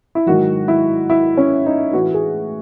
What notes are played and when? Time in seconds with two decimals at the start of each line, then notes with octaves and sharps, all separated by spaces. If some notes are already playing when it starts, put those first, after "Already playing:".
0.15 E4
0.26 G#2 D#3 F#3 F#4
0.68 E4
1.10 E4
1.37 C#4
1.66 D#4
1.93 A2 E3 F#4
2.14 G#4